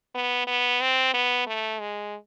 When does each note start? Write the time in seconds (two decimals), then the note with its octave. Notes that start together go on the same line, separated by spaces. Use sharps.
0.15 B3
0.47 B3
0.81 C4
1.14 B3
1.47 A3
1.80 G#3